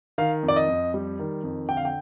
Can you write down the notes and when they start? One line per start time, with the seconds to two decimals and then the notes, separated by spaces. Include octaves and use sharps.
0.18 D#3 F5
0.43 F2
0.48 D5
0.56 D#5
0.68 F2
0.94 G3
1.19 D#3
1.43 F2
1.69 D3 G5
1.77 F5
1.85 G5